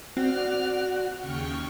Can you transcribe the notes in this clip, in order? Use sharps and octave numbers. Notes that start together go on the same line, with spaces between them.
C4 F#4 D5 F6
D#2 C#3 G5 C#6 F6